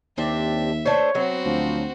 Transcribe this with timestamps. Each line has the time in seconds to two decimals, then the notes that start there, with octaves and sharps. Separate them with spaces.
0.18 D#2 C4 D4 G4 E5
0.85 A3 D4 C5 C#5
1.15 F#3 B3 C4 F#4
1.45 D2 F3